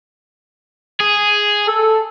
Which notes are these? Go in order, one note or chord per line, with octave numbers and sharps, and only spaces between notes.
G#4
A4